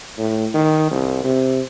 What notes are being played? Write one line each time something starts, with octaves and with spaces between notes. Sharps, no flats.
A2
D#3
C2
C3